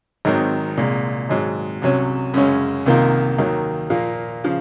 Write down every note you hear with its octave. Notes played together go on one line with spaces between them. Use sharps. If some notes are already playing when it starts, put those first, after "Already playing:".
G#1 G#2 D#3 F#3 C4
C2 A#2 G#3
G#1 G#2 F#3
C2 C3 F#3 C#4
F#2 C#3 G#3 C#4
C2 C3 D#3 A#3 F4
D#2 D#3 F#3 A#3
A#2 F3 A#3 F4
C#3 F3